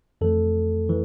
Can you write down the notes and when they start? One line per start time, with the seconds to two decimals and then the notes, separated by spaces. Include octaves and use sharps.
0.21 F2 E3 A3 A4
0.89 E3